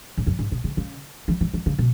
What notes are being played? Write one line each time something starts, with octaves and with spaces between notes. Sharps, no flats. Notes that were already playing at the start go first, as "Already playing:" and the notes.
G#2
F#2
G#2
B2
C#3
C#3
E3
E3
E3
C#3
B2